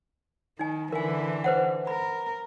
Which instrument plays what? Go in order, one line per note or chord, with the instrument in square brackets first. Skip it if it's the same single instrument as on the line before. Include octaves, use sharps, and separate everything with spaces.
[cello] D#3 [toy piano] D#4 G#5
[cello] D3 E3 [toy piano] A#4 G#5
[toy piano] B4 C5 F#5
[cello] A#4 [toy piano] B5